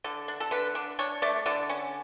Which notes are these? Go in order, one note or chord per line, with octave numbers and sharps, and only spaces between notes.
D3 A4
D4
A4
D3 B4
D4
D4 C#5
A3 D5
D3 D5
C#4